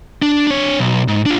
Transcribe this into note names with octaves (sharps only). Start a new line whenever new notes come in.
D4
D4 C#5
B1
G#2
D4 F4